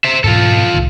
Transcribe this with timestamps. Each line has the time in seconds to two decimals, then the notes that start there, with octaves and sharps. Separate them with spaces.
0.04 C5 E5
0.24 G#2 B2 E3 F4 A4
0.74 C2 A2 D#3